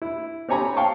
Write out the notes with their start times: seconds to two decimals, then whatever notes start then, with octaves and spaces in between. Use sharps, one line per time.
0.02 E4
0.48 C4 G4 C#5 G#5 A#5 B5
0.76 F5 G5 A5 C#6